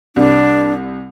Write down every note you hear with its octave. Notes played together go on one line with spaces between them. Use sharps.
C2 G3 D4